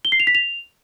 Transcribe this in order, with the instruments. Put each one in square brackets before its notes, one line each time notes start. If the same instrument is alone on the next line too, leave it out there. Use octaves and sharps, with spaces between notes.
[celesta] G7
C7
F7
B6
F7